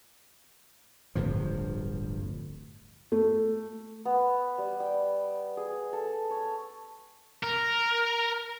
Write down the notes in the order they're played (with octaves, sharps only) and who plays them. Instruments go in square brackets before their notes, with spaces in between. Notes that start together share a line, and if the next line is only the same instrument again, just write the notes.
[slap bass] D1 G1 G2 F3
[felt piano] A3
[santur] B3
G3
G5
G#4
A4
C#5
[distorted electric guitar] A#4